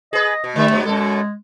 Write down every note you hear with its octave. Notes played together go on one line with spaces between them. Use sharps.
G#4 B4 D#5
B2
D3 G3 A3 E5
G2 F#3 B3
F#2 B2 G#3 A4